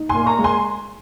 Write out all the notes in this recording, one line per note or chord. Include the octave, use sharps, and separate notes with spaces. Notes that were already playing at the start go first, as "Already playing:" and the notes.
Already playing: D#4
G#5 C6
A#2
A#5 C#6
G#3
G#5 C6